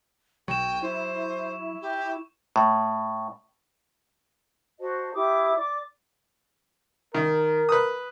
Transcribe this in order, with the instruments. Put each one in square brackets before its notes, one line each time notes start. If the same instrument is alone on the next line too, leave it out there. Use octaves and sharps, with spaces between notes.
[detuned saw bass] B1 [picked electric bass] F#3 [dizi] G5 [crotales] C#6 E7
[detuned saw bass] E4 [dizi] C5
[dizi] G4
[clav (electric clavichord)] A2
[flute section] F#4 C5 D#5 A5
E4 G4 D6 D#6
D5 D6
[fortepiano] D#3 [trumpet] A#4
[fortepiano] B4 D#6